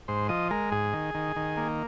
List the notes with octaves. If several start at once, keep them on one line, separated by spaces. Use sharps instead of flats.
G#2 C5
F3 D#5
G#3 A#4
G#2 G#4
D#3
D#3
D#3
A#3